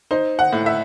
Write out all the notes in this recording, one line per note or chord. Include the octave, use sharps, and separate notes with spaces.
D#4 C5
F#5
A2
E5